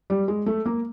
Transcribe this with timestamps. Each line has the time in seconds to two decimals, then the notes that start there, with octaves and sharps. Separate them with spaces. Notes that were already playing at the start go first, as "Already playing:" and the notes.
0.10 G3
0.28 G#3
0.46 A3
0.66 A#3